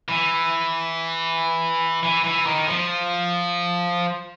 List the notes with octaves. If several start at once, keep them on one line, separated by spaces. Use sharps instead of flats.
E3
E3
E3
D#3
F3